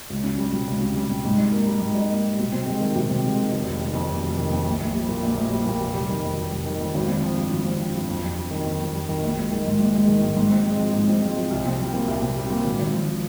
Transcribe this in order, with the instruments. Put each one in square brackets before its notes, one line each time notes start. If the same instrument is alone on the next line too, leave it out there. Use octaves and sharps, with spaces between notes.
[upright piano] C#2
C#4
G3
C3
C#2
C#4
G3
C3
G#2
D#4
A#3
G3
G#2
D#4
A#3
G3
C3
C4
G#3
D#3
C3
C4
G#3
D#3
F1
F1
D#3
F2
F1
F1
D#3
F2
A#1
A#1
G3
A#2
A#1
A#1
G3
A#2
F1
G3
D#3
F2
F1
G3
D#3
F2
G#1
C4
F3
G2
G#1
C4
F3
G2
F2
F2
G3
D#3
F2
F2
G3
D#3
A#1
G#3
D#3
G#2
A#1
G#3
D#3
G#2
G#2
C4
G#3
F3
G#2
C4
G#3
F3
C2
C4
G3
A#2
C2
C4
G3
A#2
G#1
G#1
F3